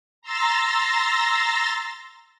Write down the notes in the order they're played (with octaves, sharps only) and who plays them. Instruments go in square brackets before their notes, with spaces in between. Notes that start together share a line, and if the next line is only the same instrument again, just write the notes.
[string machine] A#5 C6 E6 A6 A#6